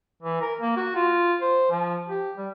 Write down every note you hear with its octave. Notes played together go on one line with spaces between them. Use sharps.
E3
A#4
A#3
F#4
F4
C5
F3
G4
G3